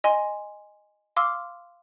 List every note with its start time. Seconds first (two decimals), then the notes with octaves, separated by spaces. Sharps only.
0.04 D#5 G#5 C6
1.16 F5 C6 D6 E6 F6